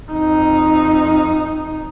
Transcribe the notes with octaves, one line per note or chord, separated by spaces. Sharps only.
F2 D#4